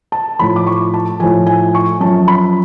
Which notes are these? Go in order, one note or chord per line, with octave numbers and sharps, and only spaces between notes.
A5
A2 F3 B5
D6
C#6
A5
A2 F3 G#5
G#5
C#6
F#2 F3 A5
B5